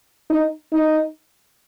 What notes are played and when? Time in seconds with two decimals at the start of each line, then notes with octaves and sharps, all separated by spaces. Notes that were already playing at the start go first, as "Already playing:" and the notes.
0.30 D#4
0.73 D#4